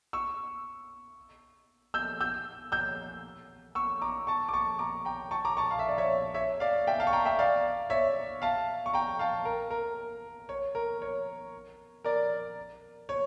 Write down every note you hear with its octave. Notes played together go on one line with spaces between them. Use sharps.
C#6 E6
E6 G6
E6 G6
E6 G6
C#6 E6
A#5 D6
A5 C#6
D6
A5 C#6
A#5 D6
G5 A#5
A5 C#6
A#5 D6
A5 C#6
F5
E5
D5
C#5 E5
C#5 E5
D5 F5
E5 G5
F5 A5
C#6
G5 A#5
E5 G5
D5 F5
C#5 E5
F5 A5
C#6
G5 A#5
F5 A5
A#4
A#4
C#5
A#4
C#5
A#4 D5
C#5